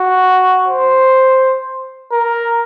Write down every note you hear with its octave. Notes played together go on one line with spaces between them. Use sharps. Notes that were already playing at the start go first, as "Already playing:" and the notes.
Already playing: F#4
C5
A#4